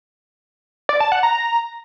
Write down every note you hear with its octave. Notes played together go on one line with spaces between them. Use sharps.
D5
A5
F#5
A#5